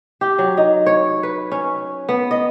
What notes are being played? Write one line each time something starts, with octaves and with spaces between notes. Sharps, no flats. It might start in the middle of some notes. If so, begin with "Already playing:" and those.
G4
F#3
D#4
C#5
B4
C#4
B3
D#5